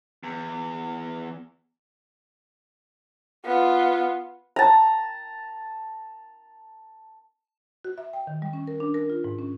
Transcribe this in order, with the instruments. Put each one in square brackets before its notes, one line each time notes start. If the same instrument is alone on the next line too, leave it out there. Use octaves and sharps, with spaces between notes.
[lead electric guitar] E2
[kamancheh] B3 F4
[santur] A5 A#5
[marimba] F#4
E5
G5
D#3
G3
C#4
A#4
D4
A#4
F4
G#2
C#4